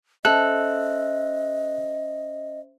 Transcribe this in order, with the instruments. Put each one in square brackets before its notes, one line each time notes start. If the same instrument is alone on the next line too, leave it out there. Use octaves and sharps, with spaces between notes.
[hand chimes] C#4 C5 E5 [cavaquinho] A4 [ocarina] D#5 [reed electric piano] F#6